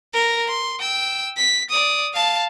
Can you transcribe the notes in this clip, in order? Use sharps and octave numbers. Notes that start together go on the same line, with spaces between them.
A#4 A#6
C6
G5 E6
B6
D5 D#6
F5 A5